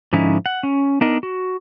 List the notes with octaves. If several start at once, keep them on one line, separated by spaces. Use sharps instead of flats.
G#2 D3 F3 C#4 D#4 E4
F#5
C#4
B3 D4 D#4 A#4 D#5
F#4